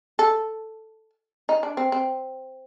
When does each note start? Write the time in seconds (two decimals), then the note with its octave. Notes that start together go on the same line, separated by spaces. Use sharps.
0.19 A4
1.49 D#4
1.63 D4
1.77 C4
1.92 C4